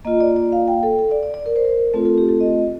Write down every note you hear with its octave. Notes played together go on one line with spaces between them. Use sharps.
A#3 F4 D#5
D5
D5
F5
G5
A4
A4
D5
D5
D5
A#4
C5
A#4
A3 C4 F4 A4
A4
G4
A4
D#5